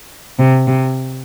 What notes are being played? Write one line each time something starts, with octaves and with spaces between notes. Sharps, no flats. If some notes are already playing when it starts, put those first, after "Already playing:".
C3
C3